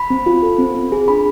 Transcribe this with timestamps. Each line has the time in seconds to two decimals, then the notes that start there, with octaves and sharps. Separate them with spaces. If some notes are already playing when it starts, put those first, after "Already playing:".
Already playing: B5
0.10 C4
0.26 F4
0.43 A4
0.58 C4
0.75 C4
0.92 G#4
1.08 D4 B5